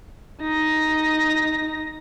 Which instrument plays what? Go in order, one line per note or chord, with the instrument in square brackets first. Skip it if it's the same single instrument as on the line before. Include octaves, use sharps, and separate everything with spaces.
[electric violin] D#4 A#6